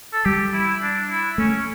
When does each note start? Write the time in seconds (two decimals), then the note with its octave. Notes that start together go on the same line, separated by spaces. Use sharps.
0.13 A4
0.25 G3 G4
0.53 E4
0.82 D4
1.10 E4
1.38 A3 C#4